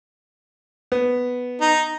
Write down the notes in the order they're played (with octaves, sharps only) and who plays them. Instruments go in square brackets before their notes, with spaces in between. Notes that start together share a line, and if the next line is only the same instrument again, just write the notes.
[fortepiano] B3
[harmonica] D#4